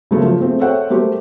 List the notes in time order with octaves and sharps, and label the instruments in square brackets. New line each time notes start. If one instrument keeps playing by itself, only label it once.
[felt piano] C#3 G#3 A3 A#4
F3
A3 C4 G#4
A4 C5 C#5 E5 F#5 G5
G3 A3 G4 A#4 C5